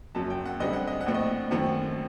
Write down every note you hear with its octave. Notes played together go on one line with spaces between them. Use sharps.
F#1 F#2 F#3 A5
G5
F#5
D2 D3 G3 C4 D#5
F#5
D#5
F#5
A#1 A2 A3 C4
D#5
F#2 D#3 A3 C4 F#5